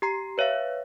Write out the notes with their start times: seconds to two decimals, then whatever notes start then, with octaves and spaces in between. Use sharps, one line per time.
0.02 G4 A#5 C7
0.38 B4 C#5 E5 F5